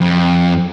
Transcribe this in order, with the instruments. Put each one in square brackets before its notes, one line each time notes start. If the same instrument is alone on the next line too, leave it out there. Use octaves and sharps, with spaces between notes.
[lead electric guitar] F2